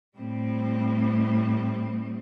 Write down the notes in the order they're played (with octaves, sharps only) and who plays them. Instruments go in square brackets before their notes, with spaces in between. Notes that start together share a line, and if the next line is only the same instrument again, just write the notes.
[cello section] A2 G3 C4